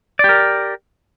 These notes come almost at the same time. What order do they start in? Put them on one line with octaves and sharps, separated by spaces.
D5 G4 A#4